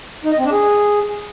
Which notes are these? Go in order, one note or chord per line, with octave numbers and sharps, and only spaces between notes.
D#4
D#5
C4
D4
G#4